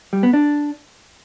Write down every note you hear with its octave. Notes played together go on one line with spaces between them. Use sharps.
G3
B3
D4